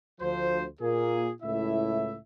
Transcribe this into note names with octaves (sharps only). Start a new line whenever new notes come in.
D2 F3 C5
A#2 A#3 G#4
C#2 A2 E4 E5